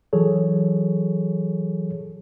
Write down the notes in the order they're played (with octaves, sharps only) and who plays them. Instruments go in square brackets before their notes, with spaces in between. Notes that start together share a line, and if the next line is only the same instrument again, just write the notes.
[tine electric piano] E3 F#3 G#4 A4 C#5